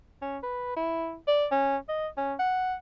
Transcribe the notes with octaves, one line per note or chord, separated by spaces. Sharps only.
C#4
B4
E4
D5
C#4
D#5
C#4
F#5